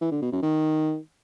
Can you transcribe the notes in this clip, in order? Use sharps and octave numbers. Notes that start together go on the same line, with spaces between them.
E3
D3
B2
F#2
D#3